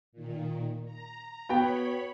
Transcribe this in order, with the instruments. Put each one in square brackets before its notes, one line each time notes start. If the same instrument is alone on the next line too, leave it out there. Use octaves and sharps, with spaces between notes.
[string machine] A#2 D#3
A#5
[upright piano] B3 F#4 G5 [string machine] C#5 B5